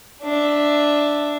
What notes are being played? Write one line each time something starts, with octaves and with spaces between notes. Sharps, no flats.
D4 E5